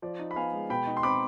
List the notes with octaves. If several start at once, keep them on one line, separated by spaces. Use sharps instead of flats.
F3 D5
D#4
B5
B3 F5 G#5
G#3
B2 G5 B5
D#4
C6
C4 B5 D6